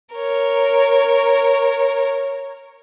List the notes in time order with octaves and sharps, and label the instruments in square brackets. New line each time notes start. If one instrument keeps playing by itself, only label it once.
[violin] A#4 C#5